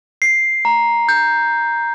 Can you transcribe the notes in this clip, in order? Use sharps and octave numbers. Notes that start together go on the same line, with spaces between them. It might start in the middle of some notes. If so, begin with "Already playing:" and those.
C7
A#5
G6